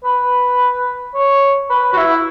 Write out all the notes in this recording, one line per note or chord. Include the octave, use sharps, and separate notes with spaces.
B4
C#5
B4
F#4
E4